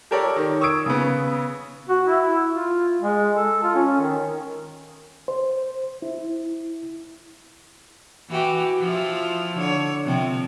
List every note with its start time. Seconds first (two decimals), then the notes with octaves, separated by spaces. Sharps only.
0.11 G4 A4 A#4 C#5 D5
0.36 D#3
0.61 C#6 D#6 E6 G#6 D7
0.86 C#3 B3
1.89 F#4
2.06 E4
2.50 F4
3.02 G#3
3.35 A4
3.63 F4
3.75 C#4
4.01 D#3
5.28 C5
6.02 E4
8.30 E3 F#4 G4
8.81 F3 E4 F4
9.58 D3 C#5
10.05 C3 F3 C4